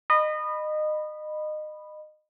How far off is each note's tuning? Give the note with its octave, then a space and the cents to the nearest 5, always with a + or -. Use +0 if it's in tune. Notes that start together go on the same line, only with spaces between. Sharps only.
D#5 -25 B5 +0